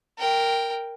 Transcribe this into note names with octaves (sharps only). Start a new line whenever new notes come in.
A#4 G5